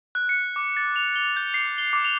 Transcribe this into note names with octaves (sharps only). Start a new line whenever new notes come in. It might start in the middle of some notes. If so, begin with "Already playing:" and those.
F#6
C#7
D6
A6
F7
G7
G6
C7
G7
D6
F7